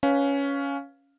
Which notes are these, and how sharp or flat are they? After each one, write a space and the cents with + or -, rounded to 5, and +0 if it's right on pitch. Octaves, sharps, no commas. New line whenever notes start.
C#4 +10 B4 +0 F5 +0